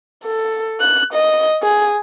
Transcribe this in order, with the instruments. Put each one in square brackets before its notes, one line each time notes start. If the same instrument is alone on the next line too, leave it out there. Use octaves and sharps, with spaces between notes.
[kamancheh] A4
F#6
D#5
G#4